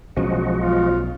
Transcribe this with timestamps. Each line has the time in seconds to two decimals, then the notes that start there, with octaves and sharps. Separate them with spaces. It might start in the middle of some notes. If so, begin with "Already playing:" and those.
0.17 B1 F3 F#3 G#3 C#4 F#4
0.56 F4